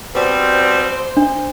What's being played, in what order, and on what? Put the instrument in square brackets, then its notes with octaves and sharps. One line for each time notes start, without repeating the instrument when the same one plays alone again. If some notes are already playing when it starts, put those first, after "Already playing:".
[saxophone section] B2 G3 C4 [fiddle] C5
[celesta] D4